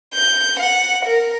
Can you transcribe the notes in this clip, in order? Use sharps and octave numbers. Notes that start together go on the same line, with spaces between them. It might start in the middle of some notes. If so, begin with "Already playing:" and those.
G6
F#5
A#4